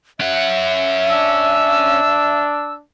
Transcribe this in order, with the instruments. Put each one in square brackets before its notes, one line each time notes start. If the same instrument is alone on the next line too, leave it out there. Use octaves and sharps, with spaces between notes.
[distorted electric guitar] C#4 F#5 [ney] E5
[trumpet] D4 [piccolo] E6